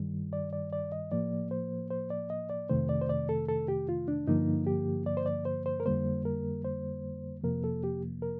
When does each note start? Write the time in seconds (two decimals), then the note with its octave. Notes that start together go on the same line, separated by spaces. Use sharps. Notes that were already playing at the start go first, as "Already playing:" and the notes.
Already playing: G2 D#3 G3
0.33 D5
0.53 D5
0.73 D5
0.92 D#5
1.12 A2 F3 A#3 D5
1.51 C5
1.91 C5
2.10 D5
2.30 D#5
2.50 D5
2.70 F2 C3 D#3 A3 C5
2.89 D5
3.01 C5
3.09 D5
3.29 A4
3.48 A4
3.68 G4
3.89 F4
4.08 D4
4.28 G2 D3 F3 A#3 D#4
4.67 G4
5.06 D5
5.17 C5
5.26 D5
5.45 C5
5.66 C5
5.80 A#4
5.86 F2 D3 G3 A#3 C5
6.25 A#4
6.65 C5
7.43 F2 C3 F3 A#3 A#4
7.64 A4
7.84 G4
8.22 A#4